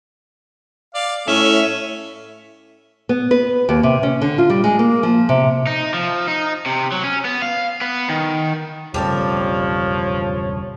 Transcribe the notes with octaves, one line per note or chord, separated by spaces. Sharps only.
D5 F5
A2 A3 C#4 E5
B3
B4
D#2
C3
C#4
D3
F4
G3
G#3
A#3
F3
C3
D#4
F3
D#4
C3
F#3
C#4
B3
F5
B3
D#3
E1 G2 C#3 F3 G3 A4 A#4 C#5